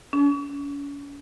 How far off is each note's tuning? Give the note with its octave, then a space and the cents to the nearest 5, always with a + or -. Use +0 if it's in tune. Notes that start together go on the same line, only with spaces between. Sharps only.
C#4 +40